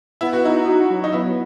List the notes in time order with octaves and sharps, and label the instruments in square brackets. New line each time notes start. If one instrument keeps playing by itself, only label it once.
[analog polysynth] B3 [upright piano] E4
[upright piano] F#4
[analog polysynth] D#4 [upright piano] E4
[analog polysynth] F#4
F#3
[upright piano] D#4
[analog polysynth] B3 [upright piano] E4